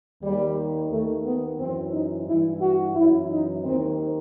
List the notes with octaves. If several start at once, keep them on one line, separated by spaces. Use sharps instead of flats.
D#2 D#3 G3
D#2 D#3 A3
B3
F#2 E3 C4
D#4
G2 E3 E4
F#4
F#2 E3 E4
D#4
D#2 D#3 C4